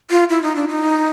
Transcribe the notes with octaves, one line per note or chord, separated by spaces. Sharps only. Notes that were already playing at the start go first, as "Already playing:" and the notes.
F4
E4
D#4
D4
D#4